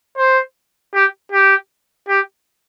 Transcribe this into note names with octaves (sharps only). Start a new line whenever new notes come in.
C5
G4
G4
G4